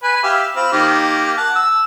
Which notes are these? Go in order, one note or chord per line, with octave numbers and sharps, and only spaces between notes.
B4 G#5 B5
G4 E5 F5
C4 F4 B5
D#3 A#3 G4
F#5 A5
E6